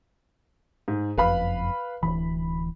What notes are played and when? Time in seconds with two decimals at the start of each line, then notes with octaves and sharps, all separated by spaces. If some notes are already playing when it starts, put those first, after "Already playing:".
0.88 G#2
1.18 F#1 F2 B4 F5 B5
2.03 D1 G#1 E3 B5